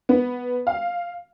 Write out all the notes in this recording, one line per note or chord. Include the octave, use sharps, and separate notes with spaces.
B3
F5